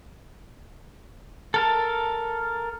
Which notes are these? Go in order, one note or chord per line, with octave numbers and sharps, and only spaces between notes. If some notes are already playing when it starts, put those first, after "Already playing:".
A4 A#4 A5